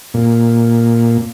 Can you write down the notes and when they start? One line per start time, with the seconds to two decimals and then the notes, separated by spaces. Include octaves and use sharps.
0.14 A#2